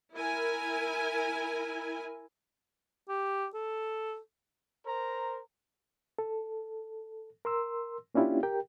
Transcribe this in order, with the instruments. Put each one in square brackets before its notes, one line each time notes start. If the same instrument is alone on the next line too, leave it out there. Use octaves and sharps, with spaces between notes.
[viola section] E4 A#4 G#5
[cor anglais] G4
A4
[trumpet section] A#4 C5 A#5
[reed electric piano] A4
A#4 C6 E6
A#3 C#4 D4 E4 F4 G4
G4 A#4 G5